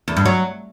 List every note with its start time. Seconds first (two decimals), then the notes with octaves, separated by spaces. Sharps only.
0.08 E2
0.17 G2
0.25 F#3